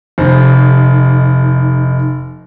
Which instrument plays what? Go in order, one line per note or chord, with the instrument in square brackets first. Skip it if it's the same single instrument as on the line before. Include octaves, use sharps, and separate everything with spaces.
[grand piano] F1 C5 [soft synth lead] D#4